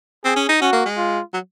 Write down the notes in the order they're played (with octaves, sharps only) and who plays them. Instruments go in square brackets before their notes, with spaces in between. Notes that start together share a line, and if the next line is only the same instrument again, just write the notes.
[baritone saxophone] C4 [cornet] G#4
[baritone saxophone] C#4
D#4
[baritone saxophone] C#4 [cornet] F#4
[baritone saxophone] A#3
G#3
[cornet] F4
[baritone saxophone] F#3